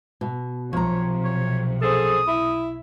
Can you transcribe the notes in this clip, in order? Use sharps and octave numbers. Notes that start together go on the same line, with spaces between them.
B2
B1 C3 F3 C#5 A#5
C#5
G#4 A4 C5 D#6
E4 E5